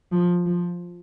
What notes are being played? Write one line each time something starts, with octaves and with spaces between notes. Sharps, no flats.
F3
F3